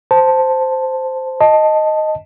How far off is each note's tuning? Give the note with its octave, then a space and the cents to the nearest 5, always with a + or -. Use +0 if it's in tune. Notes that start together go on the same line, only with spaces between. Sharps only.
C5 -5 A5 +0
D#5 +0 A5 +0